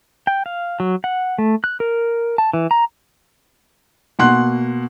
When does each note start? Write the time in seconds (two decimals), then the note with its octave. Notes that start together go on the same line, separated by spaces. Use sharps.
0.27 G5
0.46 F5
0.80 F#3
1.04 F#5
1.38 A3
1.64 F#6
1.80 A#4
2.38 A5
2.53 E3
2.71 A#5
4.19 B2 A#3 F#5 C6 F#6